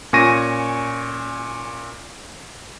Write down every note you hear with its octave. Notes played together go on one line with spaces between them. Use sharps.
A#2 C#4 G#5 C#6 A#6 D#7